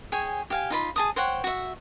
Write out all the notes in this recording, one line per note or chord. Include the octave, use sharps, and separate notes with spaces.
G#4 C#5 G5 G#5
G4 F5 G#5
D#4 F4 B5
G#4 A5 D#6
C5 C#5 F#5 G5
F#4 E5